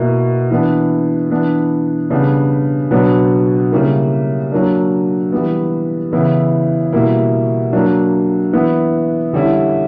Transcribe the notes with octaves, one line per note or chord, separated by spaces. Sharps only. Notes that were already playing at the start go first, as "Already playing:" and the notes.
Already playing: B2 A#3 E4
E3 B3 D4
E3 B3 D4
C#3 G3 B3 D4
B2 F#3 B3 D4
C#3 G3 A#3 E4
F#3 A#3 D4
E3 G3 B3
C#3 E3 B3 E4
B2 G3 A#3 E4
F#3 A#3 D4
E3 B3 E4
D3 G3 C#4 E4